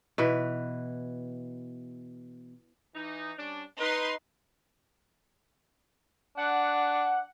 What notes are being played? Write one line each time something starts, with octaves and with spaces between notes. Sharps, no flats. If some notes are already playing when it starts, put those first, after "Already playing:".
B2 E3 B4
E3 D#4
G3 C#4 D4
D#4 B4 C6
D4 F#5